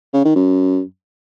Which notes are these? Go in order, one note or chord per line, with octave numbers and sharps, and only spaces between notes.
C#3
D#3
F#2